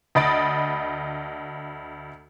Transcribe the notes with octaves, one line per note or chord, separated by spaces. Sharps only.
D2 D#5 B5 A6 D7